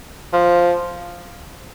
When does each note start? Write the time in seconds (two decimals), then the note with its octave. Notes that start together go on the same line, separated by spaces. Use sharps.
0.33 F3